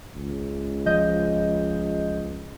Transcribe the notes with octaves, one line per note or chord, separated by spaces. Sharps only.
C#2
F3 D#5 G6